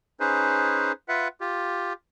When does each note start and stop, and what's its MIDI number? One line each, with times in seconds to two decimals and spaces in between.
0.20 0.92 61
0.20 0.92 63
0.20 0.92 68
0.20 0.92 71
0.20 0.92 72
1.08 1.28 65
1.08 1.28 71
1.08 1.28 76
1.08 1.28 78
1.41 1.93 65
1.41 1.93 67